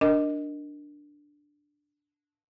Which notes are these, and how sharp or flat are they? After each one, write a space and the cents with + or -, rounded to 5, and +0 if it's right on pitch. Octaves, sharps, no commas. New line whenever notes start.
D4 +0 A#4 +0 D#5 +0